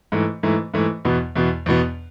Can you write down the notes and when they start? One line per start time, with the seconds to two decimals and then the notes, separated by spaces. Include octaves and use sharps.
0.12 G#2 E3 A3
0.43 G#2 E3 A3
0.74 G#2 E3 A3
1.05 E2 B2 B3
1.35 E2 B2 B3
1.66 E2 B2 B3